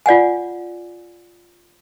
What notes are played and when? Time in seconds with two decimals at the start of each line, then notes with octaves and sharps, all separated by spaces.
0.06 F4 D5 F#5 G#5